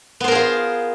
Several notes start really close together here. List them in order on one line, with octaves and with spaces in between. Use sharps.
B3 C5 A#4 G#4 F4